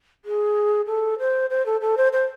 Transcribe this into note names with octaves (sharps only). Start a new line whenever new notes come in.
G#4
A4
C5
C5
A4
A4
C5
C5